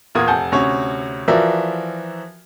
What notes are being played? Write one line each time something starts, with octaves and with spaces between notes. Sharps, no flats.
E2 A#2 F4 A#4 D#6 G#6
F1 F#5 G#5 A5 G6
D2 C3 C#4 C#5
E3 F3 F#4 A#4 D5 E5